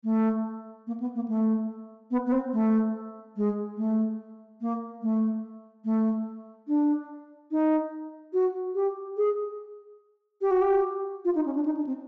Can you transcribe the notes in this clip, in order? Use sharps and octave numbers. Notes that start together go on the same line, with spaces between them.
A3
A#3
B3
A#3
A3
B3
B3
C4
A3
G#3
A3
A#3
A3
A3
D4
D#4
F#4
G4
G#4
G4
F#4
G4
F4
D#4
C#4
D4
D#4
D4
C4